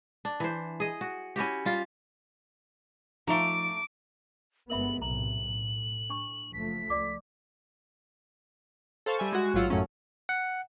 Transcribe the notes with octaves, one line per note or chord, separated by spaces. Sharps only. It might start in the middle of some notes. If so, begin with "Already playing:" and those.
D4
E3 C5
G#4 D#5
F#4
C#4 E4 F#4 G4
G3 F4
F3 A3 D#4 A#5 D6 D7 E7
G1 G#3 B3 A#4 E5 B5 F#7
B1 A2 C3 A#5 F#7
A2
D4 C#6
F#1 F3 A3 B6
C#2 D5 D6
A4 C5 F5 A5 C#6
G3 E5 G#5
G#3 F#4
A1 G#2 F#3 F4 F#5 E6
F#2 A2 F#3 A3 C#4
F#5